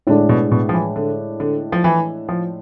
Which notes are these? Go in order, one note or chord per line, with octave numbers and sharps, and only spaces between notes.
A2 D3 G#3 D4
B2
B2
F3
E3
D3
D3
F3
E3
F3